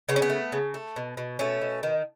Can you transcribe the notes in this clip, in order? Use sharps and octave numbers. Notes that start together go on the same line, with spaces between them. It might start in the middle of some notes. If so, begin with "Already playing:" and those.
C#3 B3
C#4
B3
A3
C#3
A3
B2
B2
B2 A3 C#4
B2
D#3